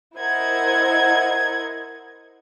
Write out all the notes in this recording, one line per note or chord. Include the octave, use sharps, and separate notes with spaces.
E4 A#4 C5 D#5 F#5 G#6